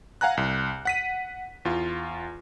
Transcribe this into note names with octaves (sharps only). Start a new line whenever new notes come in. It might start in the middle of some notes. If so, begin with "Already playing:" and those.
F5 F#5 G#5 A#5 F#6
C2
F#5 B6 D#7
E2 F4